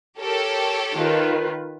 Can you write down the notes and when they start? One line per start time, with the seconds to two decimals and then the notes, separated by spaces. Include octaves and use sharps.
0.20 G4 A4 A#4 C#5
0.95 D#3 F4 B4